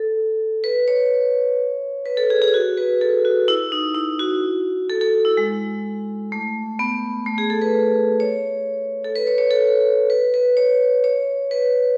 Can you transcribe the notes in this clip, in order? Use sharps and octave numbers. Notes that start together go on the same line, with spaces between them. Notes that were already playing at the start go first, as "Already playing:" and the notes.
Already playing: A4
B4
C#5
B4
A4
G#4
G#4
F#4
B4
A4
F#4
E4
D#4
E4
F#4
A4
A4
E4
G#3
A3
B3
A3
G#4
A4
B4
C#5
A4
B4
C#5
C#5
A4
B4
B4
C#5
C#5
B4